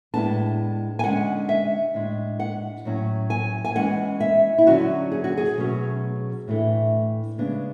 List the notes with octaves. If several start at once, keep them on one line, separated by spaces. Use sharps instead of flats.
A2 G#3 B3 D4 A5
G#5
D3 G#3 C#4 F#5
E5
A2 G#3 D4
F#5
A2 F#3 C#4
G#5
G#5
E3 G#3 C#4 F#5
E5
E4
D3 F#3 C#4 F#4
G#4
F#4
G#4
B2 F#3 A3 C#4
A2 E3 A3 D4
C#3 G#3 B3 D4